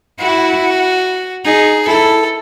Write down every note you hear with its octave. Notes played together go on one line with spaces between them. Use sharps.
E4 F#4
D#4 G#4
E4 A4